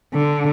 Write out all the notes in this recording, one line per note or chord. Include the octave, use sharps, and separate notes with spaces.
D3